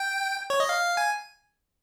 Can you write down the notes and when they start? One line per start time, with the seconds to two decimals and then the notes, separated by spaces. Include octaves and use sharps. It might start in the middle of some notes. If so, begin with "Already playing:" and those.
Already playing: G5
0.50 C#5
0.60 D#5
0.69 F5
0.97 G#5